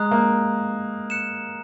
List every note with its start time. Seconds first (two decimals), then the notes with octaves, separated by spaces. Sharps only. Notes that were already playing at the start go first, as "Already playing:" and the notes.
Already playing: G#3 A#5 D#6 F#6
0.11 A#3
1.10 F#6 C#7 E7